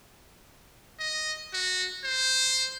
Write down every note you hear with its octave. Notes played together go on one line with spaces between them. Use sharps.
D#5
F#4
C5